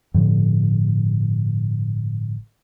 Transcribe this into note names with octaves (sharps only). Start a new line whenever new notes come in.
G1 A2 D3 F3